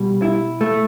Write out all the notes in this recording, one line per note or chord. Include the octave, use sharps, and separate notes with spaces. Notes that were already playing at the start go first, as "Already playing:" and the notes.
Already playing: B2 G3
E4
A3